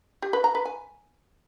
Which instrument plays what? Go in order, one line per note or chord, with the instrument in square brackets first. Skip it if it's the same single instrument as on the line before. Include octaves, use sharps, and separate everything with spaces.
[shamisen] G4
B4
A#5
B4
G#5